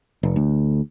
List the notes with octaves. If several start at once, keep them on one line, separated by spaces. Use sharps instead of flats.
F1
D2